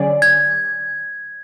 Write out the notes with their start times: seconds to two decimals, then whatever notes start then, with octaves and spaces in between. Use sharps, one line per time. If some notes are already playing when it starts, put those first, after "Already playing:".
Already playing: D3 F#3 C#4 G#4 D5
0.22 G#6